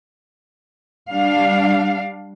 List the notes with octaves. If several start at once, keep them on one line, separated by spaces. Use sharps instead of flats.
G3 D4 F5